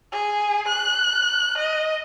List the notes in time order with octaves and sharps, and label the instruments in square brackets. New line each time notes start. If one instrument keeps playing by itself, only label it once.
[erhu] G#4
F#6
D#5